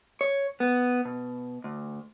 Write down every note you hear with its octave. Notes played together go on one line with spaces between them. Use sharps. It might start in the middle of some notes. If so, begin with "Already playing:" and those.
C#5
B3
B2
D2